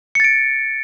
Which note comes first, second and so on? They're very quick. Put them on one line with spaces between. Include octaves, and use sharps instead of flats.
C#7 A6 D7